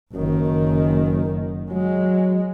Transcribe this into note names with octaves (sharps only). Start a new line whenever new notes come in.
F#1 F#2 D#3
F#3 G#3